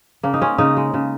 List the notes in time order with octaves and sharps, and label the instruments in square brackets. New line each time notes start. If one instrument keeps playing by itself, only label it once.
[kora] C#3 A#3
D#4
G#3 C#4
C#3 D#4
G#3
C#3